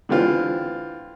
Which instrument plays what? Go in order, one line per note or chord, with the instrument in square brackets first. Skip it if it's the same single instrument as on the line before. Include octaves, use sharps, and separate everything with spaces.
[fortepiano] D3 E3 C4 F4